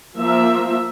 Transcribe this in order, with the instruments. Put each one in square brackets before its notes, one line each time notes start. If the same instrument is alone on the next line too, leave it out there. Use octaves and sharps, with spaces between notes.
[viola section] F3 A#3 E5